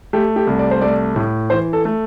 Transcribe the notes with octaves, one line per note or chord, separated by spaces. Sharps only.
A3 G4
G4
C2
D5
C5
A3 D5
A2
E3 C5
A4
A3